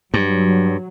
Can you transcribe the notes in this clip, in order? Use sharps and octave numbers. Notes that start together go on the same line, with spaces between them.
G2 F#3